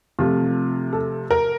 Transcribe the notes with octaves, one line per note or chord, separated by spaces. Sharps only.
C3 F3 A3 F4
A4
A#4